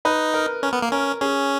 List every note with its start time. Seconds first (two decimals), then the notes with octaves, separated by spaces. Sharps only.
0.05 D#4 B4
0.34 A#4
0.63 C#4 A#4
0.73 B3
0.82 A#3
0.92 C#4 A#4
1.21 C#4 G#4